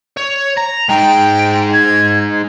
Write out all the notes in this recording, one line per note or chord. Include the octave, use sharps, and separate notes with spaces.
C#5
A#5
G#3 D#4 G5
G#6